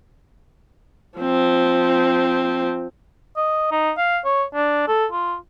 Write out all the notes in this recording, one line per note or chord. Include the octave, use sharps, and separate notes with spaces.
F3 C4
D#5
D#4
F5
C#5
D4
A4
F4